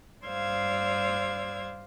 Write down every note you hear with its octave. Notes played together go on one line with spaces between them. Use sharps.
G2 C5 D5 F5 E6 G#6